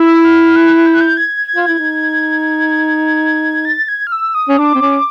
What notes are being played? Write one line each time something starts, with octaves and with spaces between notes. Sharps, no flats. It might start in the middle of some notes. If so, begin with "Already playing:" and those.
Already playing: E4 E6
F6
F#6
G6
F#6
G6
G#6
G#6
F4
E4
D#4
A6
G#6
F6
E6
D#6
C#4
D4 D6
C4
C#4